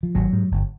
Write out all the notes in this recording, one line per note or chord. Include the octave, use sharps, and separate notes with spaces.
F3
G#1 F#3
G#2
G1